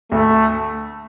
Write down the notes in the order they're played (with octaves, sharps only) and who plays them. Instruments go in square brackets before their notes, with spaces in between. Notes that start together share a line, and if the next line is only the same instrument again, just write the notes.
[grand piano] D2 [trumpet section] A3